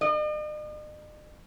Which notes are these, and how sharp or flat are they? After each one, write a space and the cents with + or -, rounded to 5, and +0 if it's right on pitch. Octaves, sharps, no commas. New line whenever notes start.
D#5 -45